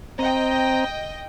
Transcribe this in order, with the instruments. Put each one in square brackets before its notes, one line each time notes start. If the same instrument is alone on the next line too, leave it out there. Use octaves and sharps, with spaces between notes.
[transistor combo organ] C4 A#5 [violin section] D#5 G5